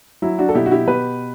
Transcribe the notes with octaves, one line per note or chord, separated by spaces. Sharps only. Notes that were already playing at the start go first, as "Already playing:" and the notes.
F#3 E4
D4 F#4
A4
B2 E4 G4
F#4
E4 G4
B2 G4 B4